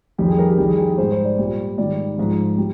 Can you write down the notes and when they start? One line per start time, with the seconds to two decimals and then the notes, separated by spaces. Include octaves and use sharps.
0.18 F2 D#3 G3 G4
0.29 G#4
0.39 A#4
0.49 G4
0.58 F2 D#3 G3 G#4
0.69 G#4
0.78 G4
0.89 G#4
0.98 G#2 G3 C5
1.12 C5
1.25 D5
1.38 A#2 G3
1.78 G#2 D#3 G3 D5
2.18 G#2 F3
2.58 G3